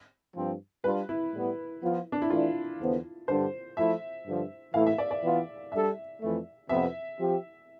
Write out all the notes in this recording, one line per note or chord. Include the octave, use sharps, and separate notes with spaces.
G2 F3 C4
G3 D4 F4 B4
E4
A2 G3 B3
F3 B3 F4
D4
E4
E3 A3 D4 F4
E2 D3 F3 B3
G2 D3 G3 D4 C5
F3 A3 E4 E5
G2 D3 F3
A2 E3 A3 E4 F5
E5
D5
D5
E3 B3 F4
G3 D4 A4 E5
F2 E3 A3
F2 C3 F3 B3 E5
F3 C4 G4